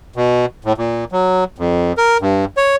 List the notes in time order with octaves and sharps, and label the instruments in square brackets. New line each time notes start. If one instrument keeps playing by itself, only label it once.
[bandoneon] B2
A2
A#2
F#3
F2
A#4
G2
C#5